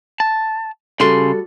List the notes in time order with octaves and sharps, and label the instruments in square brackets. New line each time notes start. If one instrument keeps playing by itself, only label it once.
[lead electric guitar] A5
[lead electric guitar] C#3 C6 [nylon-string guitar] G3 F#4 A4